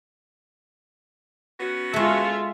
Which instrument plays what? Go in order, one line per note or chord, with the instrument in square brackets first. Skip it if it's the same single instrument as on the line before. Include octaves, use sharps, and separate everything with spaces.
[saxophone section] B3 C#4 F#4
[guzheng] G#3 A3 [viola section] F4 G#4 E5